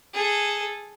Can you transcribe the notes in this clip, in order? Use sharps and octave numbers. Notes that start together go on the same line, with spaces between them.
G#4 A4